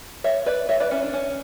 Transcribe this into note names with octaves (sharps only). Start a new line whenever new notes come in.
C#5 E5
B4 D5
C#5 E5
B4 D5
C#4 E4
D4
C#4